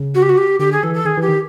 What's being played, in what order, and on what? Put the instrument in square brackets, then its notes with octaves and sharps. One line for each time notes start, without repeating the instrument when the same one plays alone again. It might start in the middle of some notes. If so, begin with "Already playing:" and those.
Already playing: [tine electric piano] C#3
[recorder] F#4
G4
F#4
G4
[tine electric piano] D3 [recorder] G4
[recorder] G#4
[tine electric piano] E3 [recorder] A4
[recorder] A4
[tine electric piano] D#3 [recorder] G#4
[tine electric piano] E3
[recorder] G4
[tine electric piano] D#3